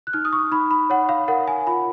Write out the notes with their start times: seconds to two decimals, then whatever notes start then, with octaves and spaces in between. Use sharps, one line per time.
0.07 F#6
0.13 D#4 F6
0.25 D#6
0.33 C#6
0.52 D#4 B5
0.71 B5
0.90 C#5 F#5
1.09 F5
1.28 A#4 F#5
1.48 G#5
1.67 F4 B5